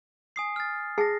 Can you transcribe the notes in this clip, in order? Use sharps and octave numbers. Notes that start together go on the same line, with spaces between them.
G#5 D#6 C7
F6 A6
G#4 G#5 A5 A#6 C7